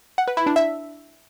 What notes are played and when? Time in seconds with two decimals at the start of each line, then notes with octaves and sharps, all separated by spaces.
0.18 F#5
0.28 B4
0.37 E4
0.46 D4
0.56 E5